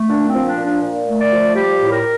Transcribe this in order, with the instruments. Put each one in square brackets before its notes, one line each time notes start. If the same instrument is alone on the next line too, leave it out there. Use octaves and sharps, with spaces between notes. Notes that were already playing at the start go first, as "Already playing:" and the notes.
Already playing: [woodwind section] A3
A#2 D4
C4
F3
D4
A#2
D4
A#2
A3
D5
F3
G3 G4
A2
A#4